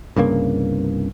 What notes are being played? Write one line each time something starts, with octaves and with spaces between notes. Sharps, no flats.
C2 G2 C#3 A#3